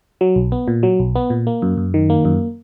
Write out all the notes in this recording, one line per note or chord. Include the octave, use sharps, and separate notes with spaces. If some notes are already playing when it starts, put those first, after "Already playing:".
F#3
B1
B3
A#2
F#3
B1
B3
A#2
A#3
F#2
F#2
D#3
A#3
F#2